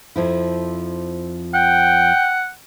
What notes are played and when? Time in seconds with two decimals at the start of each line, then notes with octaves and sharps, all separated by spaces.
0.16 F2 F3 E4
1.54 F#5 G5